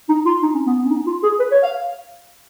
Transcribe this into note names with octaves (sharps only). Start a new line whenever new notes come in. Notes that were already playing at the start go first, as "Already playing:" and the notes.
D#4
F4
D#4
C#4
B3
B3
C#4
D#4
F4
G#4
B4
C#5
F5